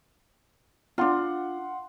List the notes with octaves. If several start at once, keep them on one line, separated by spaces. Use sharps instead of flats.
D4 F4 F5 F#5 C6